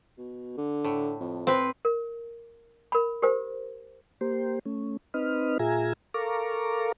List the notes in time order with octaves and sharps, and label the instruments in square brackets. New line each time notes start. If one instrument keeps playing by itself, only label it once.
[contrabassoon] B2
D3
[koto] A2
[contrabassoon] F2
[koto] C4 B4
[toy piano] A#4
A#4 B5
G4 A#4 C5
[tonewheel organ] A#3 G4 C5
A3 C#4
C4 D#4 B4 D#5 F6
A#2 F4 G#4 E5 G#5 A#5
A4 A#4 F5 A#5 C#6 D6